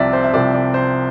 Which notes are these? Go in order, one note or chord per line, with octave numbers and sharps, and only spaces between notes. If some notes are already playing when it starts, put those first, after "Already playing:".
Already playing: C2 C3 F3 D5 E5
C5
E5
C2 C3 F3 D5
D5
C5